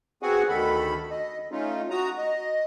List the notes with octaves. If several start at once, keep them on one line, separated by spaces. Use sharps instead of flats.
B3 C4 F#4 G#4 F#5 G#5
D2 D#3 A4 B5
D#5
A3 C#4 D#4 F4
F#4 A#5 D#6
D#5